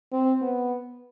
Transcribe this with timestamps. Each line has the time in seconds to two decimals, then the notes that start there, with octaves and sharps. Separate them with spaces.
0.12 C4
0.41 B3